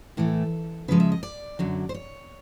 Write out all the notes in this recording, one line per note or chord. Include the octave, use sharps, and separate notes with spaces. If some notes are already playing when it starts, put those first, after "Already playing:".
A2 E3 A3 A4
C#3 F3 G#3 B4
E5
D#5
D5
F#2 D3 F#3
C5
C#5